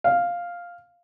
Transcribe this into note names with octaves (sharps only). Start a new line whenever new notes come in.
F5